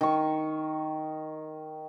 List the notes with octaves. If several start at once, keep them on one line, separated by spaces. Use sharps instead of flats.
D#3 C#6